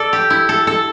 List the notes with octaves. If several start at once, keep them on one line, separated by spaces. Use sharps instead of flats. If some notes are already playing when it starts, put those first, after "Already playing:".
Already playing: A4 D5
G4
E4
A4
A4